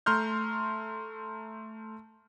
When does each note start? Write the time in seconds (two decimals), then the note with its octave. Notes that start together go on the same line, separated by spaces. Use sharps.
0.06 A3 A#5 C6 F6 G6